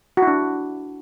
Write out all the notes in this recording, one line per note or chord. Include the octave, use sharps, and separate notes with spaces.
F#4
E4
D4